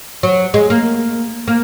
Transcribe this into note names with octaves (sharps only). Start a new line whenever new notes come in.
F#3
G#3
A#3
A#3